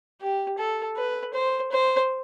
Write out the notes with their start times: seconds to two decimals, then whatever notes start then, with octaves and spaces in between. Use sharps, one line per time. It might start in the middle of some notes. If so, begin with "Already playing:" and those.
0.21 G4
0.58 A4
0.97 B4
1.34 C5
1.72 C5